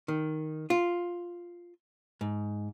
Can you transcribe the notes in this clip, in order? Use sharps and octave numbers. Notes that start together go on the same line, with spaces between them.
D#3
F4
G#2